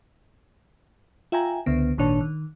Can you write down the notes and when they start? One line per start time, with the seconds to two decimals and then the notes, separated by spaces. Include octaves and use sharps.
1.32 F4 E5 G5 G#5 A#5
1.66 C#2 D3 B3
1.98 G#1 A#2 D#3 D4 C#5 A5
2.21 D#3